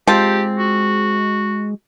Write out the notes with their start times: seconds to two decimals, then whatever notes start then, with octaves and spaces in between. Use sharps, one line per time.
0.07 G#3 C4 F4 G4 A5
0.57 F#4